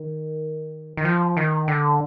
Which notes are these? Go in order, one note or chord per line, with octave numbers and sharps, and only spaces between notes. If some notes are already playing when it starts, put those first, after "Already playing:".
Already playing: D#3
D#3
F3
D#3
D3